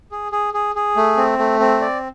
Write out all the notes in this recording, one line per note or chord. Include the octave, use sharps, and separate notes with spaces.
G#4
G#4
G#4
G#4
A3
C4
A3
C4
D5